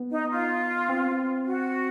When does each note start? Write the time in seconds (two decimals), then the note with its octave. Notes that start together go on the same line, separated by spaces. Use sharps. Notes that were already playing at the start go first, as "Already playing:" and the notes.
Already playing: B3
0.11 D#4
0.31 F4
0.89 C4
1.46 F#4